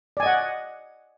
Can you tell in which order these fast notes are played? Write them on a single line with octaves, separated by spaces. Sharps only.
D5 G#5 D#5 F#5